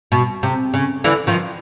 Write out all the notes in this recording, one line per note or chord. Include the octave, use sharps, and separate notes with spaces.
B2
C3
C#3
D3 E3
D#3 F3